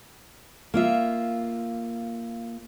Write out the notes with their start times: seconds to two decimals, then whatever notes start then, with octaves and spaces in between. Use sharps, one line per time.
0.74 A#3 F4 E5